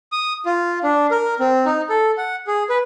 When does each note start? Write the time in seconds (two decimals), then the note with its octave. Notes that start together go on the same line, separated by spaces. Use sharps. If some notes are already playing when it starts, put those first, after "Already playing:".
0.12 D#6
0.46 F4
0.83 D4
1.11 A#4
1.40 C4
1.66 D#4
1.89 A4
2.18 F#5
2.47 G#4
2.70 B4